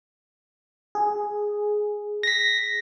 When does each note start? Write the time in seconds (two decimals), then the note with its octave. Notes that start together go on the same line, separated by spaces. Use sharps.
0.95 G#4
2.23 A#6 B6